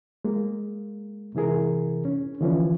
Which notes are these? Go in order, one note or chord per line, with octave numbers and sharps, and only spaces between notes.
G#3 A#3
C3 E3 E4 G#4 A#4
C#4
D3 E3 F3 C#4